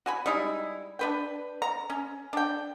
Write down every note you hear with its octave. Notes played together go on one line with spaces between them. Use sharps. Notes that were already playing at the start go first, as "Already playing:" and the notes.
F#4 G#5 B5
G3 G#3 D#4 E4
D4 B4 G5
A#5
C#4
D4 G5